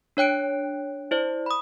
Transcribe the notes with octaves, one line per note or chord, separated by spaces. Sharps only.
D4 C#5 G5 F#6 D7
E4 C5 D5
B5 D#6